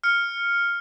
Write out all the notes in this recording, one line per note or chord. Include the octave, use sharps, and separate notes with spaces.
F6 C#7